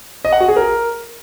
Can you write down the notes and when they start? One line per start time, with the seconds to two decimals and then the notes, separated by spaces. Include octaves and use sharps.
0.25 D#5
0.33 F#5
0.40 F#4
0.48 G#4
0.56 A#4